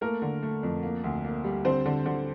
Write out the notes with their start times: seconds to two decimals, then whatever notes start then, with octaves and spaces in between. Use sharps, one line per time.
0.01 A3 A#3 A#4
0.22 D3
0.43 A3
0.63 F2
0.83 A#3
1.04 D2
1.25 A#3
1.44 G3
1.65 D3 C4 C5
1.86 D3
2.06 D3